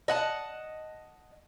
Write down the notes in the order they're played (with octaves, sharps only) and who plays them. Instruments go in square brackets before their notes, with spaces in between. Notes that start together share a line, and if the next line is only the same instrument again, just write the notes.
[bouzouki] D#5 F#5 A5